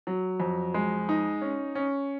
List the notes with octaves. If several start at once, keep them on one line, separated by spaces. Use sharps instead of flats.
F#3
F2
G#3
D#4
C#4
C#4